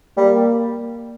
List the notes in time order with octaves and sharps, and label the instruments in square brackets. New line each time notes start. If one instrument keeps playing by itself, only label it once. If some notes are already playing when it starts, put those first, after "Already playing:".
[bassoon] G3 [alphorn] A#3